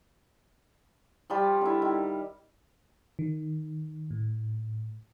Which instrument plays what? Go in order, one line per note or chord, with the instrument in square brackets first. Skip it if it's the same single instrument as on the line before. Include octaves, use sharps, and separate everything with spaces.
[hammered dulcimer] F3 G3 F4
D3 E4
D#3
[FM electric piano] D#3
A2